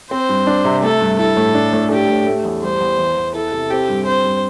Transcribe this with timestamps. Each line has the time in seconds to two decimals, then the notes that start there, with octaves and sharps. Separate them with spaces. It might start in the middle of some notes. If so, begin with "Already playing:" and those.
0.11 C4 C5
0.29 G2
0.47 D4
0.65 C3
0.83 A3 A4
1.01 G2
1.19 E4 A4
1.37 A2
1.55 D4
1.73 A2
1.91 D4 G4
2.09 A2
2.27 A3
2.44 E2
2.62 G3 C5
2.80 E2
2.98 E3
3.16 E2
3.34 E4 A4
3.52 C3
3.70 C4 G4
3.88 G2
4.06 C4 C5
4.24 G2